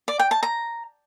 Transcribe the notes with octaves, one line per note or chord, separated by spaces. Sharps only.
D5
G5
A5
A#5